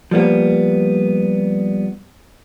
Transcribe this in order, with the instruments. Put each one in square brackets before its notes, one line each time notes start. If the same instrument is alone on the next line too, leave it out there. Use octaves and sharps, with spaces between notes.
[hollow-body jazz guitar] F3 G3 A#3 B3